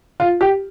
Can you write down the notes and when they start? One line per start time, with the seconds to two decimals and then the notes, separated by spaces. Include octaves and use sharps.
0.20 F4
0.41 G4